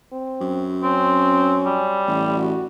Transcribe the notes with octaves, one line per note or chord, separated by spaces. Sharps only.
C4
F#2
C4 C#4
G3
A1
F#4